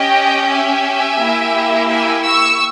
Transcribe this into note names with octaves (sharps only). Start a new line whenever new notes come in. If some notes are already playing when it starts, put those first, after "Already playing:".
Already playing: C#4 G4 D#5 G5
E5 G#5
A#3 E4 G4
E5 G#5
C#6 E6